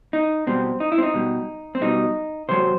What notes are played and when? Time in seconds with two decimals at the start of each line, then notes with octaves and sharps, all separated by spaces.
0.13 D#4
0.47 B2 G3 C4
0.80 D#4
0.92 E4
0.98 C4
1.03 D#4
1.14 B2 G3
1.75 C4
1.81 B2 G3 D#4
2.49 C3 F#3 C5